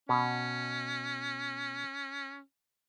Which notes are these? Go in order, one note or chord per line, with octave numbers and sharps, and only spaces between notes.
B2 C#4